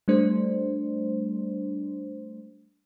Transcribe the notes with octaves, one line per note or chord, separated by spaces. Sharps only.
G3 A3 D4 C5